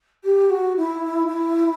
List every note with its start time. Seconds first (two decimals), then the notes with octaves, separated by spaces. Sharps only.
0.24 G4
0.49 F#4
0.76 E4
1.26 E4